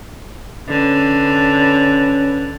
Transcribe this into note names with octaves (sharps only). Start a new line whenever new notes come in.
D3 C#4 B4